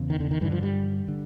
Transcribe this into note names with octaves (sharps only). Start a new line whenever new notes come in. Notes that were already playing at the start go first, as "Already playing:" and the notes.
Already playing: E2 C#3
D#3
D3
D#3
G2 D3 E3
F3
G3
D3